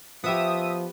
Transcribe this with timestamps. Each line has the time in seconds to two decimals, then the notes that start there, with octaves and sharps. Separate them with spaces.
0.24 F3 B3 G4 E5 D#6